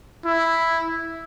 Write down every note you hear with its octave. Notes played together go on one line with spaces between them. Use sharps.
E4